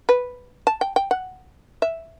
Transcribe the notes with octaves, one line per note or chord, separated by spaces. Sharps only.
B4
A5
G5
G5
F#5
E5